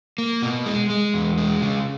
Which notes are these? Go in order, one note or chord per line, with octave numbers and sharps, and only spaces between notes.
A#3
B2
G#3
G#3
E2
G#3
C#3